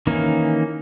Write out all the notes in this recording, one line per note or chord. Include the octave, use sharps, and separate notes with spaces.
D#3 E3 A#3 C#4 D#4